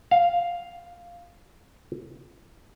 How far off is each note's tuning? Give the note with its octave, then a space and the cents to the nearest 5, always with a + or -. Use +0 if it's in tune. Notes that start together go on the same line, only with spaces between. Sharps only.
F5 +0